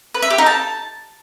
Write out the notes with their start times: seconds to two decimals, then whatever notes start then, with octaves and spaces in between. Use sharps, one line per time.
0.15 B4
0.22 E5
0.30 G4
0.38 D#4
0.46 A5